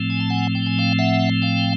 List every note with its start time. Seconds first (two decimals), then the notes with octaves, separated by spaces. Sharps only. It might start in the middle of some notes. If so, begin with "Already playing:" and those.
Already playing: A2 F3 A3 C4
0.10 G#5
0.20 A5
0.30 F#5 G#5
0.55 G5
0.66 G#5
0.79 F5 G5
0.99 E5 F#5
1.42 F5 G5